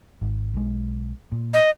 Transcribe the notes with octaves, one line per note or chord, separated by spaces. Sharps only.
G#1
B1 G#3
A#2
D#5